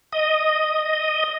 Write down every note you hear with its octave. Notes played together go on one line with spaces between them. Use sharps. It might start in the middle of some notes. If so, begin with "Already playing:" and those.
D#5